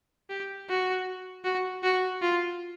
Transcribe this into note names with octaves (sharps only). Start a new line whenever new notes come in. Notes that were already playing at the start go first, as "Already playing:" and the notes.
G4
F#4
F#4
F#4
F4